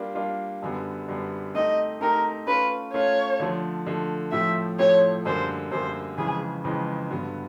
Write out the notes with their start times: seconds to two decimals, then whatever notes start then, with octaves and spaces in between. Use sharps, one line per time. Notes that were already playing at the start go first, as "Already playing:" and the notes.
Already playing: G3 A#3 D4 F4
0.15 G3 A#3 D4 F4
0.62 F#2 D3 G3 B3
1.08 F#2 D3 G3 B3
1.55 A3 C4 D#4 G4 D#5
2.01 A3 C4 D#4 G4 A#4
2.47 A3 C#4 F4 B4
2.94 A3 C#4 F4 C#5
3.40 D3 F3 A3
3.86 D3 F3 A3
4.32 A2 F3 A3 C4 E5
4.79 A2 F3 A3 C4 C#5
5.25 F#2 D3 G3 A#3 C5
5.71 F#2 D3 G3 A#3 C5
6.18 F2 C#3 E3 G#3 G#4
6.64 F2 C#3 E3 G#3
7.10 G2 D3 F#3 B3